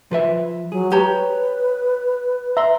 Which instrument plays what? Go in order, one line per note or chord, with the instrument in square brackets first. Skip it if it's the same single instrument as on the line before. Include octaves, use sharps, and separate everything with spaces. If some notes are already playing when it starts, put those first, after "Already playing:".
[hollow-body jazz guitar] F3 B4 E5
[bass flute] F#3 [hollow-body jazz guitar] G#4
[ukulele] G4 C#5 A#5 [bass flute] B4
[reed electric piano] E5 [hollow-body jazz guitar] A#5 C6